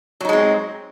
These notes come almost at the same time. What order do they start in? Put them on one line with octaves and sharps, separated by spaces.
F#3 D#4 G#3 C4